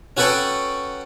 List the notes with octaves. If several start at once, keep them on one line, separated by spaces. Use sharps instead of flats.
C#4 F#4 A4 B4 F#5 G5